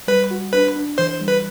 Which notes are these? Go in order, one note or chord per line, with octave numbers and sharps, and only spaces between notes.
G3 B4
F#4
D4 B4
D4
E3 C5
G3
B4